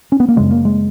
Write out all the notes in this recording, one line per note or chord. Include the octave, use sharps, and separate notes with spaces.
C#4
B3
A#3
F#2 C#3 G#3
A#3
G#3